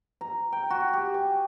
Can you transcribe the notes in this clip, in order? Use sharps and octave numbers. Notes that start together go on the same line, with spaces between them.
A#5
G5
F#4
G4
G#5